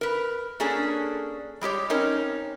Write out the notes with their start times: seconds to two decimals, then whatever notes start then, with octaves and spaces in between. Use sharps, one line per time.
0.01 A#4 B4
0.60 A#3 C#4 D4 G#4 A4
1.61 G3 G#3 G4 C#5
1.90 C4 C#4 D#4 A#4